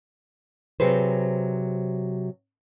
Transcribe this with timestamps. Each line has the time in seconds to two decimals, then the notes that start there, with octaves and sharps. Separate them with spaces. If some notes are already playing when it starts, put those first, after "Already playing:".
0.80 C3 F#3 G#4 B4 C5